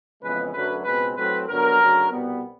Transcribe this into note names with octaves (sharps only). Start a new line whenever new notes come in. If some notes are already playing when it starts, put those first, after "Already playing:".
F2 C#3 E3 G#3 B3 B4
F#2 D3 F#3 A3 B4
C#2 B2 G#3 C4 B4
A2 F#3 A3 C4 B4
G2 D3 F#3 B3 A#4
D2 C#3 F#3
C2 B2 G3 B3